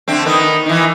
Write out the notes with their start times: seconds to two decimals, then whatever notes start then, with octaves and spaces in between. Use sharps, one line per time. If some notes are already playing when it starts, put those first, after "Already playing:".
0.08 D3 A3 C4
0.26 D#3 B3
0.66 D#3 E3